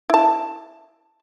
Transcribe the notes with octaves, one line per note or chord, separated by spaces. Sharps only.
E4 A5